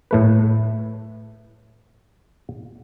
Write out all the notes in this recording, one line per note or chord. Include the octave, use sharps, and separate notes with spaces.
A2 A3 B4